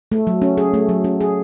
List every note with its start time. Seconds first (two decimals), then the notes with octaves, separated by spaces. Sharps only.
0.12 A3
0.27 F#3
0.42 C#4
0.57 G#4
0.74 A3
0.89 F#3
1.04 C#4
1.21 G#4